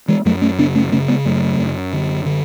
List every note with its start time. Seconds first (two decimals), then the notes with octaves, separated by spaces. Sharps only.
0.08 E3 G#3
0.25 F#2 F#3 A3
0.42 A3 C#4
0.59 C#3 B3 D4
0.75 A3 C#4
0.92 C#3 A3 C#4
1.08 G#3 B3
1.25 F#2 F#3 A3
1.59 F#2
1.93 D3
2.26 D3